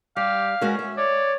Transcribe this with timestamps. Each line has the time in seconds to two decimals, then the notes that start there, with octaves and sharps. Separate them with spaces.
0.17 G3 G4 F5
0.61 G#3 C#4 F#4 A#4
0.79 E5
0.97 C#5 D5